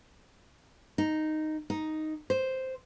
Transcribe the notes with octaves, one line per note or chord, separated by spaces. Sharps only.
D#4
D#4
C5